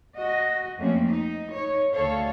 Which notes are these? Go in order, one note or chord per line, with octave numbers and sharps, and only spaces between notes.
F#4 D#5
F2 F#3 A3 A#3 C4 C#4
D#4
D#4 C#5
D2 A4 C#5 F5